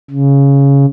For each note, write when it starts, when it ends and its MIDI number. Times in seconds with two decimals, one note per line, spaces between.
0.10 0.85 49